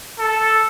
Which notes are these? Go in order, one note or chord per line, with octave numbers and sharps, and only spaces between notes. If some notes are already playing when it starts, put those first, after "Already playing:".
A4